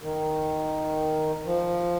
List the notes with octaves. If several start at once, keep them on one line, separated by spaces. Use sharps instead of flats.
D#3
F3